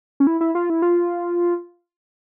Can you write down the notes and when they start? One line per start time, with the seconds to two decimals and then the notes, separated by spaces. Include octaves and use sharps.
0.20 C#4
0.27 E4
0.41 E4
0.55 F4
0.70 E4
0.82 F4